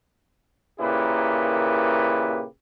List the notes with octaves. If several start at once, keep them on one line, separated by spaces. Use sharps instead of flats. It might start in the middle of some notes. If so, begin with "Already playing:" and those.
A#2 C#3 A#3 E4 G4 B4